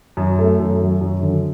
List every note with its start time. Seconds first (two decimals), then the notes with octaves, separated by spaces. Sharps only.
0.17 F#2
0.39 A3
0.60 F#2
0.81 F#3
1.01 F#2
1.22 D3